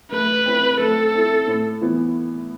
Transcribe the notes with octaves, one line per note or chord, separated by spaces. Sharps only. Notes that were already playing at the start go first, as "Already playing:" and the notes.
A3 B4
C4 E4
A3 A4
C4 E4
A2
E3 B3 E4